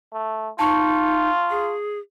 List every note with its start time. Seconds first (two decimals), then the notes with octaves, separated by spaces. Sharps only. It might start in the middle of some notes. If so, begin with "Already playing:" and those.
0.13 A3
0.59 D#4 F4 A5 C#6
1.50 G#4